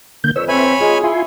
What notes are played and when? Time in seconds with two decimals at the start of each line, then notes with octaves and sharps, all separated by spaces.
0.24 D3 A#3 G6
0.36 F2 B4 C#5 E6
0.48 C4 B4 C#5 E5 G#5 B5
0.81 G#3 F4 G#4
1.04 E4 F4 G#5 C6